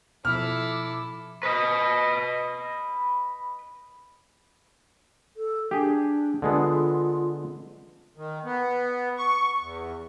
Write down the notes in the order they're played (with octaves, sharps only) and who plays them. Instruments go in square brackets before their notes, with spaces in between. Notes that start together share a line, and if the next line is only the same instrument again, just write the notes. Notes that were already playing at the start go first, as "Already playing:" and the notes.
[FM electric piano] B2 F3 [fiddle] E4 A4 [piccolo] D6 [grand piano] F6
[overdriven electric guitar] B4 D#5
[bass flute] A4
[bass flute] D4 [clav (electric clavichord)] G4 G#4
[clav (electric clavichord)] D3 G#3 B3 [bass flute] F4
[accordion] D#3
B3
C#6
E2